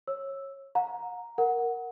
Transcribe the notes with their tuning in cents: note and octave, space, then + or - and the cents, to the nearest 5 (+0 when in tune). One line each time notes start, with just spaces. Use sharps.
C#5 -20 E6 +0
F#5 -40 A#5 +0
A#4 +0 F#5 +0